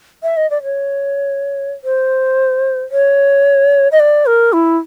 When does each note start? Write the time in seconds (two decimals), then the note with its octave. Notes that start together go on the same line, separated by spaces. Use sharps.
0.23 E5
0.37 D#5
0.50 D5
0.63 C#5
1.84 C5
2.91 C#5
3.92 D#5
4.00 D5
4.26 A#4
4.53 E4